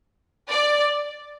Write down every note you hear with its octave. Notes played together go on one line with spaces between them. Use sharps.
D5